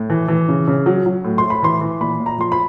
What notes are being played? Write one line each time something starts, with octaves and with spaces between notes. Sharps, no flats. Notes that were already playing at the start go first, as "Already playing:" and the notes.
Already playing: A2
E3
E3
C#3
C#3
F#3
F#3
A2
C6
A2
B5
E3 C6
E3
A#2 B5
A#2
A#5
F3 C6
B5